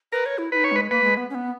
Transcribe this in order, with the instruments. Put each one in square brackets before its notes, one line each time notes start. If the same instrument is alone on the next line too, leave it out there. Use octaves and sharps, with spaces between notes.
[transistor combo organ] A#4 [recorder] B4
[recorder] C#5
E4
[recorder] D#4 E4 [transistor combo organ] B4
[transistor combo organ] C#5
[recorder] G#3 [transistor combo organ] B4
[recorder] A#3 [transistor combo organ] B4
[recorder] G#3
B3
C#4
B3